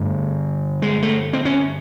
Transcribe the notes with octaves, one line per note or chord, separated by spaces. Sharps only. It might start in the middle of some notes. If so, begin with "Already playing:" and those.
Already playing: G2 D3 A3
G#3
A3
C4
C#4